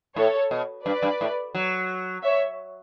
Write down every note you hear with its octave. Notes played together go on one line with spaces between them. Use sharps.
A2 A4 C#5
B2
G2 B4 D5
G2
A2
F#3
C#5 E5